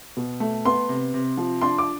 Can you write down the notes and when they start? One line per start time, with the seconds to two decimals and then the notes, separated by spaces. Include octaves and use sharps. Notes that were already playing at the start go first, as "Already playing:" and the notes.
0.17 B2
0.40 A3
0.65 B3 C6
0.89 C3
1.14 C3
1.37 F3
1.62 D4 C6
1.78 D6